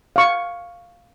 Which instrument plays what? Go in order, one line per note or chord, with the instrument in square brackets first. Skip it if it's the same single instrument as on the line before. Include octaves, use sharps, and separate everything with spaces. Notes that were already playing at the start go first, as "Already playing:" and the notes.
[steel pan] F5 C#6